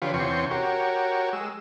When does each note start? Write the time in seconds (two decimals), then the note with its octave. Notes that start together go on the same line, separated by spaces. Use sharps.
0.02 D3 F3 F4 G4 B4 C#5
0.14 E2 C3 C#4 G5 C6 C#6
0.51 F#4 G4 A#4 C#5
1.33 G#3 E6